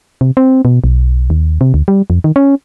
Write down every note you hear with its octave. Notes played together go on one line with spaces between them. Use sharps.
C3
C4
B2
B1
D#2
C3
D2
G3
F2
D#3
C#4